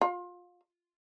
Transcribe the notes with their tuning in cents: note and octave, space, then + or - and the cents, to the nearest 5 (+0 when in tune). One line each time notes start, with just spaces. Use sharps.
F4 +25